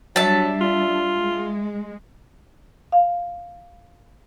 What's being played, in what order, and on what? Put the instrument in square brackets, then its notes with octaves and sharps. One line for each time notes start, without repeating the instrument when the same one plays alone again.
[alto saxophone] F#3 [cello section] G3 D4 [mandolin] E5 A5
[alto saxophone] F4
[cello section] G#3
[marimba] F5